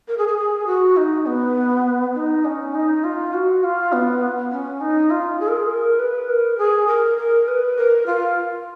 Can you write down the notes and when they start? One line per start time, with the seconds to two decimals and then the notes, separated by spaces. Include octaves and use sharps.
0.08 A#4
0.18 G#4
0.28 G#4
0.38 G#4
0.67 F#4
0.97 D#4
1.26 B3
2.15 D#4
2.45 C#4
2.75 D#4
3.04 F4
3.34 F#4
3.63 F4
3.93 B3
4.52 C#4
4.81 D#4
5.10 F4
5.40 G#4
5.48 A#4
5.57 G#4
5.70 A#4
5.99 B4
6.29 A#4
6.58 G#4
6.87 A#4
7.18 A#4
7.48 B4
7.77 A#4
8.07 F4